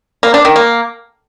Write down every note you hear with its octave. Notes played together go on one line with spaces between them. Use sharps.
A#3
D4
D#3
A#3